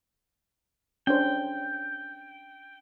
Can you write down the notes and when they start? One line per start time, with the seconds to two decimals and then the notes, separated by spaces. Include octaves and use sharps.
1.07 C#4 D4 C5 G5